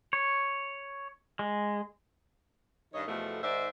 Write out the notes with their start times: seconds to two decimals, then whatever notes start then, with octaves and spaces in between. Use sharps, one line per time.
0.13 C#5
1.39 G#3
2.93 G2 D#3 C#5 D#5
3.07 E2 B2 F3 A3
3.42 G#2 D#3 C5 D5 E5